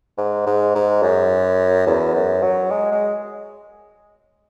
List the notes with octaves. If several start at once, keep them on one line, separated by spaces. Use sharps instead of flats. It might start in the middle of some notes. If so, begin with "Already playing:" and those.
G#2
G#2
G#2
F#2
E2
F#2
F#3
G#3
G#3